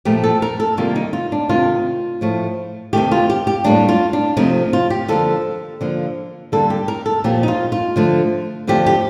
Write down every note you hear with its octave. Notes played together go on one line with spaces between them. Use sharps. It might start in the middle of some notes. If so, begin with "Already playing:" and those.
A#2 F3 A3 G4
A4
A#4
A4
C3 D#3 G3 A#3 F4
D#4
F4
D4
C3 D#3 A3 F4
A2 F3 A3
C3 D#3 A3 G4
F4
G4
G4
A2 G3 A#3 D4
F4
D4
C3 F3 A3 D#4
F4
G4
D3 F3 A#3 A4
D3 F3 A#3
D3 G3 A#3 A4
G4
A#4
A4
A#2 F3 A#3 G4
D#4
F4
F4
D3 F3 A3
D3 F3 A3 G4
G4